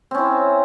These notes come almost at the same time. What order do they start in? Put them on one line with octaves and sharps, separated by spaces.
C4 C#4 E4